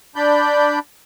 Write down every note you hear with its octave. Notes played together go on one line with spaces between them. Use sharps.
D4 D5 B5 G6